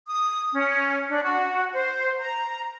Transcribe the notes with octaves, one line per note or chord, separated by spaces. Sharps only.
D#6
C#4
D4
F#4
C5
A#5